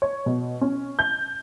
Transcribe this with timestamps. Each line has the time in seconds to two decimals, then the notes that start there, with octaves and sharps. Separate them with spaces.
0.02 C#5
0.26 B2
0.61 C#4
0.99 G6